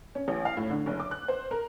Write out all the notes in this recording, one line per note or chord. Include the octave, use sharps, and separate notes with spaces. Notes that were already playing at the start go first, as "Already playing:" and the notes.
C#4
A1
F5
A2
D3
F#1
D6
F#6
C5
A#4